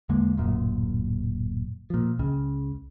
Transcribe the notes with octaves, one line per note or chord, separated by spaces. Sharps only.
E2 D3 G#3 A#3
D1 F#2 A#2
A#2 F3
C#2 C#3